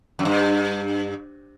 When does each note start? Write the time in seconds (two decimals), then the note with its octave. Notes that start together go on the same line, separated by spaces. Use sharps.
0.19 F#2
0.25 G2